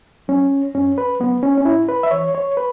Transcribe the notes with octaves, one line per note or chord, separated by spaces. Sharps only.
F#3 C#4
F#2 C#4
B4
C#3 F#3 B3
C#4
C#4
A2 E4
B4
E5
E3 C#5
C#5
B4